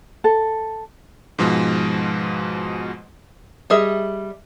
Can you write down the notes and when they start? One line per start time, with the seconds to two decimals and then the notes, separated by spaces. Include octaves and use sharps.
0.24 A4
1.39 G#2 B2 F3 G#3
3.70 G3 G#4 D#5 E5